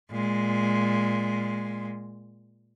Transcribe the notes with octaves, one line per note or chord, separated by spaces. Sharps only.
A#2 G#3